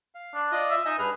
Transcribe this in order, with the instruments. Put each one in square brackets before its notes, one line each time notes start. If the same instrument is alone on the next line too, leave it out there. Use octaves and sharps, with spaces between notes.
[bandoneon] F5
[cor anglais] D4
[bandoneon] F4 D5 D#5
[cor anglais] E5
[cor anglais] D#4 [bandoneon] D#5 G#5 E6
[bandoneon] G2 G#4 F6 [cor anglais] B4